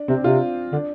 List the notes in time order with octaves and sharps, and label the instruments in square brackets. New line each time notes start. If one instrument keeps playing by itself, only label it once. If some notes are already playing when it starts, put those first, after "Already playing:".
Already playing: [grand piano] D4
[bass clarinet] C3 [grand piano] C4
[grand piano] D4
[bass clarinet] C3 [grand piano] F4
[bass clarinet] D3 [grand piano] D4